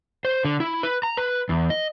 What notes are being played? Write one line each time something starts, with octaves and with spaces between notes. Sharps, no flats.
C5
D3
E4
B4
A#5
B4
E2
D#5